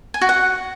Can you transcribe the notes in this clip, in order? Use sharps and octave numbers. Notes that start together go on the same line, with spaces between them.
G#5
F#4
F#5